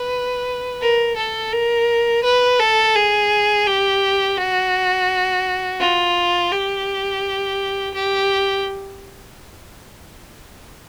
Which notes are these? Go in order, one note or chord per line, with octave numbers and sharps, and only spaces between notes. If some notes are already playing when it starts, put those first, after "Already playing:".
Already playing: B4
A#4
A4
A#4
B4
A4
G#4
G4
F#4
F4
G4
G4